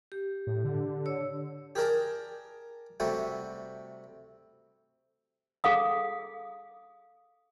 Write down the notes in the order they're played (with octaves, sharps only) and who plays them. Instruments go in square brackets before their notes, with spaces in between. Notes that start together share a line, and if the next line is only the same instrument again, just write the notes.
[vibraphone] G4
[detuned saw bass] A2
D3
[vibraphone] C#5 E6
[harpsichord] G4 G#4 A#4 D5 A5
C3 G3 A3 F#4
[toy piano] G#4 A4 F5 D#6